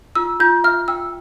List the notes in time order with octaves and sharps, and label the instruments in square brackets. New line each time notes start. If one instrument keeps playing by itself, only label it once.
[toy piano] F4 [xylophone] E6
[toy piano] F4 [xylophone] G6
[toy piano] E5 [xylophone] F6
[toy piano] G5 [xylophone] E6